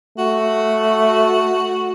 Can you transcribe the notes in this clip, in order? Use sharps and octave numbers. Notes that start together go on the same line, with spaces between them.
A3 F#4